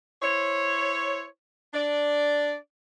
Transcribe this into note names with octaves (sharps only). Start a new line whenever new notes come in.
E4 C5 C#5
D4 D5